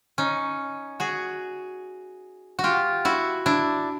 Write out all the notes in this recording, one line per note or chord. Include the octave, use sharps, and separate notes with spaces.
C#4 D#4
F#4 G#4
F#4
F4 G4
E4 F#4
D4 E4